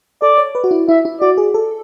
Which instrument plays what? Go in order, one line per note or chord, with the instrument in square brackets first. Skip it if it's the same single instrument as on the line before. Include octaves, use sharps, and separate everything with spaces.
[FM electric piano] A4 [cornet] D5
[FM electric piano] C#5
B4
F#4
E4
[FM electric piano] E4 [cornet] E5
[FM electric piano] E4
[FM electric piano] F#4 [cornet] D5
[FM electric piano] G#4
A4